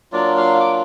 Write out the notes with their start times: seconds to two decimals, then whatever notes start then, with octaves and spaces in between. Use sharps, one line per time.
0.12 F#3 A#3 D4 F4 D5
0.37 F5
0.60 D6